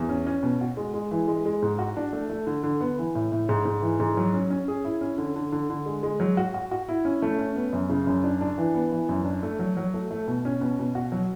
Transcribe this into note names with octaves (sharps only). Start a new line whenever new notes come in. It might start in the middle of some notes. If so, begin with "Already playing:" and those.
Already playing: E2
C#4
C#4
B2
F#4
G#3
G#3
E3
G#3
G#3
G#2
F#4
D4
A3
A3
D3
D3
B3
E3
A2
A2
G#2
G#2
E3
G#2
F#3
C#4
C#4
G#4
E4
C#4
D3
D3
D3
D3
G#3
G#3
F#3
F#4
F#4
F#4
E4
C#4
A3
C#4
B3
F#2
C#3
F#2
D4
D4
E3
B3
E3
F#2
D4
A3
F#3
F#3
A3
A3
B2
C#4
B2
B2
F#4
F#3